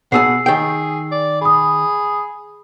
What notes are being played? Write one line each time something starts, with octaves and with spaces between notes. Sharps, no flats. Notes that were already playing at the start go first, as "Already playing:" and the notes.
B2 G#4 F#5 A5 E6 C7
D#3 G#4 G5
D5
G#4 B5 D#6